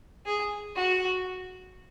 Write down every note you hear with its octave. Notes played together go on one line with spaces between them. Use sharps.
G#4
F#4